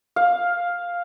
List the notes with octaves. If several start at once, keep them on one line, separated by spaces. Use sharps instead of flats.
F5